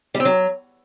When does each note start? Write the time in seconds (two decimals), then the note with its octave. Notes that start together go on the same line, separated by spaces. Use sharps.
0.14 G3
0.20 C4
0.25 F#3